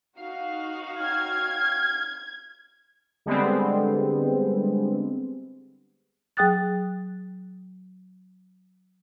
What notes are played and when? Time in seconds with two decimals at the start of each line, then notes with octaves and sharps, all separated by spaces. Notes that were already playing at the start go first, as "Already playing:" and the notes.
0.18 D#4 F#4 F5
1.00 C#5 G5 F6 G#6
3.26 D3 G3 G#3 B3 C4
6.37 F#3 G#4 G5 D#6 F#6 A6